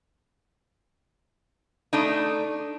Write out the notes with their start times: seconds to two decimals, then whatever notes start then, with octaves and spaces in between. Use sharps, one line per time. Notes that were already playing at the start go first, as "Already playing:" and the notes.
1.93 A3 D4 D#4